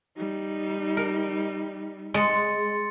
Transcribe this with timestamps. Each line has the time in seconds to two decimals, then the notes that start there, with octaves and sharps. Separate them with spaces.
0.17 G3 D#4
0.97 A#4
2.14 G#3 C6 A6 C#7